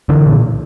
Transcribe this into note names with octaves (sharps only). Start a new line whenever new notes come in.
D3 E3
A#2